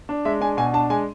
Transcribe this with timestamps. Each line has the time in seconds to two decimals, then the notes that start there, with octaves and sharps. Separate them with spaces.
0.09 D4
0.25 G#3 E5
0.41 D4 G#5
0.57 B2 G#5
0.74 D4 A5
0.90 G#3 G#5